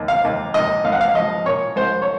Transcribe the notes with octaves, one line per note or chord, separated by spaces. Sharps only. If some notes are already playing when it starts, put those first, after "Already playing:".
Already playing: D#2
F5
D#2
D#2 D#5
D#2 F5
F#5
F5
F3 D#5
A#2 C#5
C2 C5
C#5